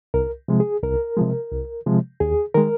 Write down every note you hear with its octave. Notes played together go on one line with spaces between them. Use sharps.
C2 A#4
C3 F3 G#3
G#4
C2 A#4
C3 F3 G#3
C2
C3 F3 G#3
D#2 G#4
D#3 G#3 A#4